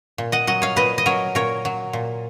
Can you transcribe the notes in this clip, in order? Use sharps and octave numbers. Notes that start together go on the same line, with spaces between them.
A#2
D#5 F#5
F#3 D#5 F#5
C#5 F5
A#2 B4 D#5
D#5
F#3 A#4 C#5
A#2 A#4 C#5
F#3
A#2